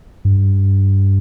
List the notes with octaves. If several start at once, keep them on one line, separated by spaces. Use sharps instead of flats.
G2